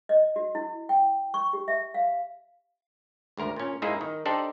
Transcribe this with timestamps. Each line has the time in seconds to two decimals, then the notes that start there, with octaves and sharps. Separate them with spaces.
0.09 D#5
0.36 F#4
0.55 E4
0.89 G5
1.34 C#6
1.53 G4
1.68 E5
1.94 F5
3.37 G#1 D2 A#4 A#5
3.56 A#2 C#4
3.82 G#2 A#3 D#4 E4 G#4 E5
4.01 D#3
4.26 D4 D#4 G4 A4 C5 D5